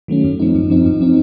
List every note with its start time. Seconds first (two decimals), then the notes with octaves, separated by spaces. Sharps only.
0.08 D#3 F#3 A3 C#4
0.24 F#2
0.40 F3 C4 D#4
0.54 F#2
0.70 F3 C4 D#4
0.86 F#2
1.01 F3 C4 D#4